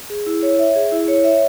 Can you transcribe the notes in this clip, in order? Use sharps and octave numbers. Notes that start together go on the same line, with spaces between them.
G#4
E4
C#5
E5
G#4
E4
C#5
E5